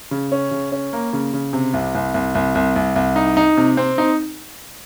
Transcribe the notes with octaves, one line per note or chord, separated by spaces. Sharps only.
C#3
C#4
C#3
C#4
A#3
C#3
C#3
C3
C2
C2
C2
C2
C2
C2
C2
D#4
D#4
C3
C4
D#4